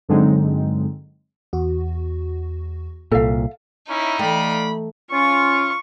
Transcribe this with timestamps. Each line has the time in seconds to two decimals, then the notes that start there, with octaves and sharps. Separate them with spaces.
0.09 G2 D3 F#3 G#3 C4 D#4
1.53 E2 F#4
3.12 C2 A#2 A4 E5 F5
3.88 C#4 D#4 E4
4.19 E3 A3 A4 D5 F5 G5 B5
5.12 C#4 F4 C#6